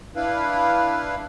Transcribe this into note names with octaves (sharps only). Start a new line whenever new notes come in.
D4 E4 B4 F5